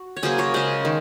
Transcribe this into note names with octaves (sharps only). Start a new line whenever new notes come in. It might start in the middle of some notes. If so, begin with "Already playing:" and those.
Already playing: F#4
C#5
C#3 F#3 A#3 G#4 C5
A#4 C#5
C#3 G#3 G#4 C5
D#3